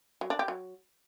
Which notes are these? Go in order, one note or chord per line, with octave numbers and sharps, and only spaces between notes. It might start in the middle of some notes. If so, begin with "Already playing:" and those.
F#3
D4
G4
F#3